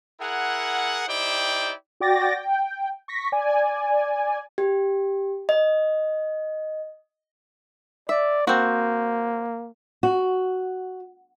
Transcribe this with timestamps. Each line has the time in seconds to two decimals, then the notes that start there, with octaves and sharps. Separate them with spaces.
0.21 E4 G#4 A#4 F#5
1.08 D#4 E4 G4 C5 D5 G5
2.00 F#4 D5 G5 D6 A6 A#6
2.36 G5
3.08 C#6 A#6 B6
3.32 D5 G#5
4.58 G4
5.49 D#5
8.09 D5 E5
8.47 A#3 C4 F#4
10.03 F#4